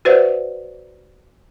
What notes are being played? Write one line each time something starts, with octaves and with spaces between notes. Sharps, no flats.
F#4 B4 C5 D5 E5 F#5